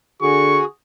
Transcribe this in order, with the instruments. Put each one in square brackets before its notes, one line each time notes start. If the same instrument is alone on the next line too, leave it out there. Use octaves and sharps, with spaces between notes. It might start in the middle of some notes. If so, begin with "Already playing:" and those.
[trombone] D3 [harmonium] F#4 G#4 [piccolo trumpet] C#6